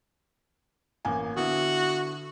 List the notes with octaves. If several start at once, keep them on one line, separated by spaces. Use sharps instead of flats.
A1 A#3 G#5
D3 B3 E4 F#4